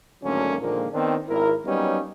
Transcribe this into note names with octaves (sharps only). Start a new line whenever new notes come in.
G#1 D2 D3 F#3 A#3 C#4
A#2 D3 D#3 F3 G#3 A#3
D#3 B3 C4 D4
G#1 E4 A#4
F#3 G3 A#3 B3 C#4 D#4